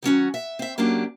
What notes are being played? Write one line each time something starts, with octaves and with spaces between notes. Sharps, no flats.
D#3 F#3 C#4 F#4
E5
C4 E5
F#3 A#3 C#4 D4 G4